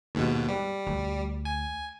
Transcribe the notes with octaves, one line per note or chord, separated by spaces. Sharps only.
D#2 G#2 B2
G3
D2
G#5